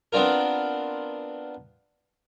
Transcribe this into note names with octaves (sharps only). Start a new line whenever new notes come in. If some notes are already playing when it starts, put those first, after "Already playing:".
B3 C4 D4 F4 A#4